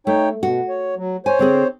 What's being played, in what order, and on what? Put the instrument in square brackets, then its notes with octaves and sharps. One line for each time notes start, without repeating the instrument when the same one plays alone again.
[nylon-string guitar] A3 [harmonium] D#4 C#5 G5
[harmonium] B2 [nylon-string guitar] F#4
[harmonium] C#5
F#3
[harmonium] C5 C#5 [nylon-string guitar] G#5
[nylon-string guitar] D3 C4 G#4